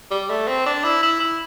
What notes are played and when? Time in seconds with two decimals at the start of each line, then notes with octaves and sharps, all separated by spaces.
0.11 G3
0.29 A3
0.48 C4
0.66 D4
0.84 E4
1.03 E4
1.20 E4